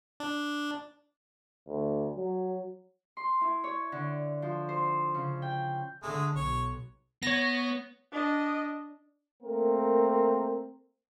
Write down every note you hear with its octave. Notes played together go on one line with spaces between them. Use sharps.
D4
D2
F#3
C6
E4
C#5
D3
F3
C5
C#3
G5
D3 G#3 A3
B1 C#5
B3 C#5 A#6
D4 D#5
A3 A#3 C4 A#4